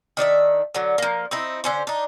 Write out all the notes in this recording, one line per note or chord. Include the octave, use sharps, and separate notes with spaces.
D#3 D4 D5 E5
D3 F#3
F3 A#3
C4 D#4 E4
D3 C#4 C5
D4 D#4